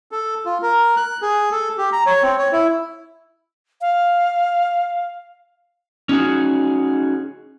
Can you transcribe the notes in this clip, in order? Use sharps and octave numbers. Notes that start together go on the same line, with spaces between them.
A4
F4
A#4
F#6
G#4
A4
G4
A#5
C#5
C4
C#5
E4
F5
C#4 D#4 F#4 G#4